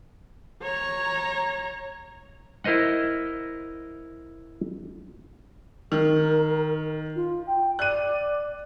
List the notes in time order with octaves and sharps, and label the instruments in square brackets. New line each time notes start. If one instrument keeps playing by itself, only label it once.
[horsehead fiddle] C#5 A#5
[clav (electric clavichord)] E4 A#4 C5 D#5 F#5
[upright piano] D#3 [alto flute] A#4
[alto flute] F4
G5
[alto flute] D5 [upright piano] F#6 D#7